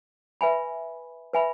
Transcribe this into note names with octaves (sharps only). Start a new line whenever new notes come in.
B4 E5 G#5 B5
B4 E5 G#5 B5